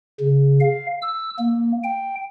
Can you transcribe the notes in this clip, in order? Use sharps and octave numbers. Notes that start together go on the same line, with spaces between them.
C#3
F5
E6
A#3
G5